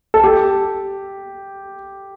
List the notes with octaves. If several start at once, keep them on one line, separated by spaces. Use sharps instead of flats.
A4
G4